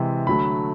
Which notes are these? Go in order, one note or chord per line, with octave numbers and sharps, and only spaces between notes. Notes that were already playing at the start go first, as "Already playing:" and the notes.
Already playing: C3 E3 G#3
D3 F#3 A3 B5